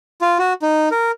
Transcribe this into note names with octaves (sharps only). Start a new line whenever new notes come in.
F4
F#4
D#4
A#4